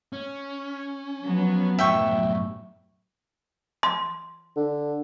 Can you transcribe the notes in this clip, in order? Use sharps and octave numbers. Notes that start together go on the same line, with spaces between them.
C#4
F3 F#3 B3
F#2 A2 E5 G5 C#6
C6
D3